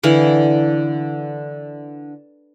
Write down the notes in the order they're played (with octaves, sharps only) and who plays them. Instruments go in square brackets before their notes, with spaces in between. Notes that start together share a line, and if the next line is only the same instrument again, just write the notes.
[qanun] D3 E3 F5